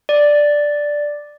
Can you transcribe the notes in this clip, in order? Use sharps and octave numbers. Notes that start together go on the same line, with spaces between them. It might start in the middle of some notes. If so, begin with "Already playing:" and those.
D5